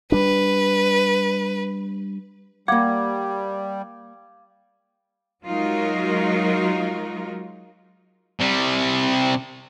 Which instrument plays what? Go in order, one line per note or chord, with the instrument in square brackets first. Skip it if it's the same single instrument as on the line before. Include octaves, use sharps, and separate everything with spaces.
[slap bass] G3 D4 [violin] B4
[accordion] G3 [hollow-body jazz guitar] A#3 F#5 [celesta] F5 D6 G#6
[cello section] F#3 G#3 D#4 F4 F#4 A#4
[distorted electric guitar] C3 G3